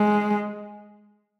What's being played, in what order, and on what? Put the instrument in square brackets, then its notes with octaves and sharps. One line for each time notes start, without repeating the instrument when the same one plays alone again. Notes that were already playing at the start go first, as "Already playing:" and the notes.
Already playing: [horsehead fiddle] G#3